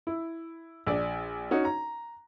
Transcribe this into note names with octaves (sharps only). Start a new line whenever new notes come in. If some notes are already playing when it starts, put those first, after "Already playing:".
E4
A#1 D5
C#4 D#4 F#4
A#5